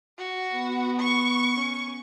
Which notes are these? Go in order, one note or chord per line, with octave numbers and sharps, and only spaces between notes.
F#4
B3
C#6
C#4